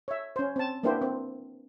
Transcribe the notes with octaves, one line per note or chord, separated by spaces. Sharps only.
C#5 E5
C#4 C5
C4 A5
A#3 B3 D4 E4 G4 C5
C4